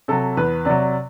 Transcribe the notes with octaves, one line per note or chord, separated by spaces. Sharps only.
C3 F#3 A4
E2 B4
C3 F#3 D5